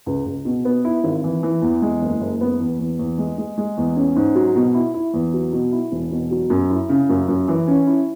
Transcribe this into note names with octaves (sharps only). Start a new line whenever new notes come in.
C#2
C#2
B2
B3
E4
G#1
E3
E3
E2
G#3
F#1
F#1
B3
E2
E2
E2
G#3
G#3
G#3
E2
C#4
G#2
F#3
B2
E4
E4
E2
F#3
B2
E4
E1
B2
F#3
F#2
E4
C#3
F#2
F#2
E3
C#4
E4